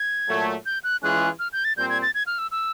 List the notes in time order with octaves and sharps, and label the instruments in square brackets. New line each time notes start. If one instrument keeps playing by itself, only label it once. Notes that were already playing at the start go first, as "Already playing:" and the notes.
Already playing: [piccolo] G#6
[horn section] A#2 F#3 A3
[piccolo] G6
F#6
[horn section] E3 G#3 C#4 F4 G#4 [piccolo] F#6
[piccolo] F6
G6
A6
[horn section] A#2 G3 C4 [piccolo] G6
[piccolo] G#6
A6
G#6
F6
E6
E6